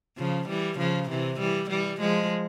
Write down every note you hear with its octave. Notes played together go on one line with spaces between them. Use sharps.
C#3 F3
E3 G3
C#3 F3
C3 E3
E3 G3
E3 G3
F3 G#3